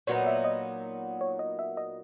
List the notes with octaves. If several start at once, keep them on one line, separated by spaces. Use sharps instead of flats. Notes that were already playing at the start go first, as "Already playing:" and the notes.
A#2 F#3 B3 D#4 C#5
E5
D#5
C#5
D#5
E5
D#5